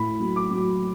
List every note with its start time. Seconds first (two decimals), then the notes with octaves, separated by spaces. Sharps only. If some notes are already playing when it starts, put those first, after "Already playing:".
Already playing: A2 B5
0.20 F#3
0.36 D6
0.51 F#3